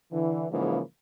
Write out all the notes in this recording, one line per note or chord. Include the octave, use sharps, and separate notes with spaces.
D3 E3
G#2 C#3 E3 F3 A#3